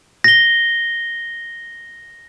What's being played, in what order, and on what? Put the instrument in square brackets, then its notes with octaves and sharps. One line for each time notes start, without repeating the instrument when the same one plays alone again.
[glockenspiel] A#6 G7